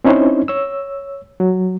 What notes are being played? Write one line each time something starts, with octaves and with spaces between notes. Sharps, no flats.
C4 C#4 D#4 E4 C5 C#5
C#5 E6
F#3